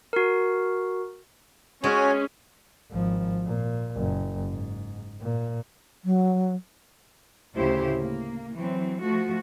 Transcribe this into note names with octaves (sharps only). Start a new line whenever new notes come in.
F#4 A#4
G#3 C#4 F#4 C#5 G#5
G#1 F3
A#2
F#1
G#2
A#2
F#3
D2 A2 C#3 E4 G4 C5
A#3
E3 F#3 C4
F3 A3 F#4